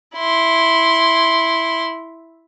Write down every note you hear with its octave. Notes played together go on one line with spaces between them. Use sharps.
E4 C6